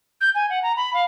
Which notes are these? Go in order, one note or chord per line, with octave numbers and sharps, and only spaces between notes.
G6
G#5
F#5
A#5
B5
F5